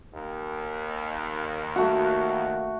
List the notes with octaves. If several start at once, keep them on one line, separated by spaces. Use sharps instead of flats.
D#2
A3 F#4